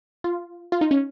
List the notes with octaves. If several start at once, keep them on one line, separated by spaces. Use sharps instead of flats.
F4
F4
D#4
C#4